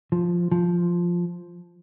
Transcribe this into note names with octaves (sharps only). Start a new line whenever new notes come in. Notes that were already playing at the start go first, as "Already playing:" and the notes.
F3
F3